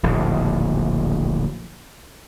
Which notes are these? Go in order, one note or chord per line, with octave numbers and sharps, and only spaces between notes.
D1 A#1 D#2